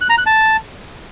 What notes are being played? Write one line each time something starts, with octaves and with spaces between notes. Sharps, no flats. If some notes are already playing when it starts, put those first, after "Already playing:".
F#6
A#5
F#6
A5